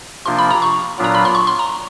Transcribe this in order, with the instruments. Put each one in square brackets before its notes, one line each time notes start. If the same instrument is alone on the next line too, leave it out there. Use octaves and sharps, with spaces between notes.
[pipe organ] C3 F3 A#3 D4 F4 [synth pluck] C6
[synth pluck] B5
A#5
C#6
[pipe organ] A#2 F#3 B3 D4 F4
[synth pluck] A#5
B5
C6
C#6
C6
A#5